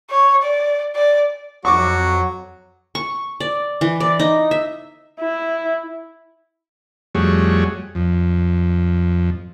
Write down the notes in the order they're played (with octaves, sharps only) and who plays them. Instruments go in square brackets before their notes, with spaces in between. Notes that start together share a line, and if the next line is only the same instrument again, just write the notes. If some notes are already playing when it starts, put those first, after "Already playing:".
[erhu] C#5
D5
D5
[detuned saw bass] F2 [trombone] F#3 [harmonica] F#4 [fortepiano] C#6 D6
[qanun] C#6
D5
E3
D5
D#4
E5
[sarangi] E4
[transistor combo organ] F2 G3 A3 F#4 G#4 C#5
F2